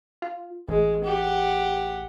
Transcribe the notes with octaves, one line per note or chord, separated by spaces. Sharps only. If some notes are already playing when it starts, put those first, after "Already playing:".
F4
A1 G#3
G4 F#5